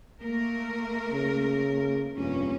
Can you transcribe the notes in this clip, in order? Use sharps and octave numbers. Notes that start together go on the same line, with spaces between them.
A3 A#3 A#4
C#3
F1 G2 A#3 C#4